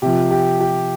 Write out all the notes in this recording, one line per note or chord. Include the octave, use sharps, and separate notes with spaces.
C3 F3 G4
G4
G4